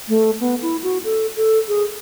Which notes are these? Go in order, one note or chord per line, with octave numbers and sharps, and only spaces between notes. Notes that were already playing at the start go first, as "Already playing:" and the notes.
A3
B3
E4
F#4
A4
A4
G#4